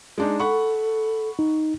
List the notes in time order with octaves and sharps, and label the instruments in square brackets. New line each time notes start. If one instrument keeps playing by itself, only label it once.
[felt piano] G#3 D4 D#4
[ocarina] A4 [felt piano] F#5 B5 C#6
[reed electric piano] D#4